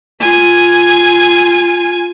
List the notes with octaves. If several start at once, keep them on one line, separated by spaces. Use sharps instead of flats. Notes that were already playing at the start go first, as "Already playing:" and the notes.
F4 G#5